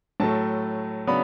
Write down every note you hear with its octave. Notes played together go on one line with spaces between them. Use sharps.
A2 F#3 A3 A5
C#3 F#3 B3 D4 B5